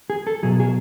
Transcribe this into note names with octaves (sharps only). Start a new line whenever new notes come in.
G#4
A4
B2 F#3 G#4
G#4